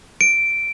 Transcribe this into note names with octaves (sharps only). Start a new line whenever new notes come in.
D7